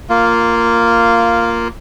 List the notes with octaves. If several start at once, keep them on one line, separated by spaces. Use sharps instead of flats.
A#3 F4